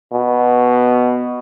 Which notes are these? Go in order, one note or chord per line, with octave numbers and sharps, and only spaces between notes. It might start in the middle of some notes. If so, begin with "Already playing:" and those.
B2